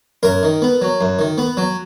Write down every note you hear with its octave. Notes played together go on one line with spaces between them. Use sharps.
F#2 A#4
D#3
B3
F#3
F#2
D#3
B3
F#3